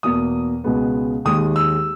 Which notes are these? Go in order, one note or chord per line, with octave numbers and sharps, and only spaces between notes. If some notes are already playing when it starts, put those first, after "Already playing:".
E2 B2 A#3 D#6
C#2 B2 G#3 B3
D#2 D#3 G#3 D#6
E6